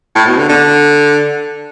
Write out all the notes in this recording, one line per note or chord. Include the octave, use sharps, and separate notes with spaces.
A2
B2
D3
D3